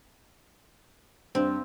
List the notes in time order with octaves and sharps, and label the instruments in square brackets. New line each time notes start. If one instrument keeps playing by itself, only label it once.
[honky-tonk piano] G2 [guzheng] C4